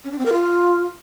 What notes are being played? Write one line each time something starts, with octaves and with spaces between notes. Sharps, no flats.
C#4
D4
C4
A#4
F4